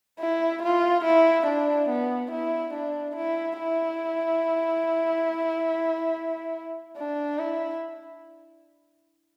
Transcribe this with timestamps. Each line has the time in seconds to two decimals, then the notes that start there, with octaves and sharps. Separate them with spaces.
0.20 E4
0.63 F4
1.05 E4
1.47 D4
1.90 B3
2.32 E4
2.74 D4
3.16 E4
3.59 E4
6.97 D4
7.39 E4